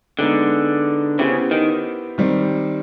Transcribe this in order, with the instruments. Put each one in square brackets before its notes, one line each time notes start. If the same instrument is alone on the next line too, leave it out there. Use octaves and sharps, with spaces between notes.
[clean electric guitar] D3 [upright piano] G#3 B3 D#4
[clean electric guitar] C#3 [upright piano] B3 E4 G4 C5
[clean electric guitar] D#3
[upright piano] D#3 G3 C4